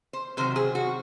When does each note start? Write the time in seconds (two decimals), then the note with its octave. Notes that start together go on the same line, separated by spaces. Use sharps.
0.13 C5
0.37 C3 D#3 F#3 C5
0.56 G#4
0.75 F#4